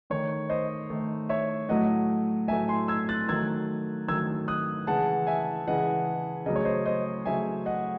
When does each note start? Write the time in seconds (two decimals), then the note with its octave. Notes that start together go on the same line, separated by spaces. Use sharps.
0.10 D#3 A3 C#5
0.50 C5 D#5
0.90 D#3 A3
1.29 C#5 E5
1.69 A2 F#3 A3 D#5 F#5
2.48 A2 F#3 A3 E5 G#5
2.68 G#5 C6
2.88 E6 G#6
3.09 F#6 A6
3.28 D#3 F#3 A3 E6 G#6
4.08 D#3 F#3 A3 E6 G#6
4.48 D#6 F#6
4.87 C#3 E3 G#3 F#5 A5
5.27 E5 G#5
5.67 C#3 E3 G#3 D#5 F#5
6.46 C#3 F#3 A3 D#5
6.56 C#5
6.65 C5 D#5
6.86 C5 D#5
7.26 C#3 F#3 A3 E5 G#5
7.66 D#5 F#5